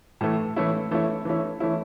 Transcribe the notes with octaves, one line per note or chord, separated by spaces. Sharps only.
A2 E3 A3
E3 A3 C#4 E4
E3 A3 C#4 E4
E3 A3 C#4 E4
E3 A3 C#4 E4